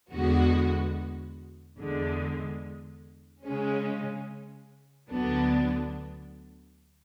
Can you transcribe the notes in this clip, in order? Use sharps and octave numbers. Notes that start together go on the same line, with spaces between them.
E2 D3 G#3 B3 F#4
E2 D3 G#3
C#3 G#3 C#4
D2 D3 F#3 B3 D4